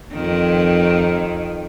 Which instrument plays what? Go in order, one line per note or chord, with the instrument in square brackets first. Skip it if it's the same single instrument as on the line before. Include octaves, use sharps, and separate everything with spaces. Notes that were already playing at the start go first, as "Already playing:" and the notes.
[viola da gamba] F2 D#3